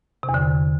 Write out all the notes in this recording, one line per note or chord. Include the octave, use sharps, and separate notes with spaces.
C3
E2
D3